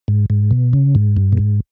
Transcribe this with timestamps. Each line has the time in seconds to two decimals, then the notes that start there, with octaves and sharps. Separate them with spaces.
0.08 G#2
0.30 G#2
0.51 B2
0.73 C#3
0.95 G#2
1.17 G2
1.33 A#2
1.37 G#2